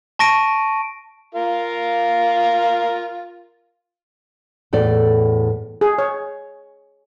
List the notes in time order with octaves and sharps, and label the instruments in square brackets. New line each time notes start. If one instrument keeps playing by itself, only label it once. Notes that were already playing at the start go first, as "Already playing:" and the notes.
[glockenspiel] A5 C#6 A#6 D7 D#7
[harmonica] F4 A#4 F5
[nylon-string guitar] E2 A2 A4 D5
[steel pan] G#4
C#5